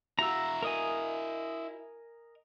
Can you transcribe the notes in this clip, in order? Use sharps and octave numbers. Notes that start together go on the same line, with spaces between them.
E4 F#4 A#5 E6
A#4 D#5 G#5